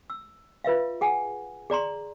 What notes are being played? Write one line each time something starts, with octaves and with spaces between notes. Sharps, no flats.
E6
F4 B4 E5 F5
G#4 F#5 G#5
G#4 D5 A#5 C6